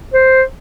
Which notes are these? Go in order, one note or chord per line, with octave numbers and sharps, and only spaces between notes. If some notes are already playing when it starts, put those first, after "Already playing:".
C5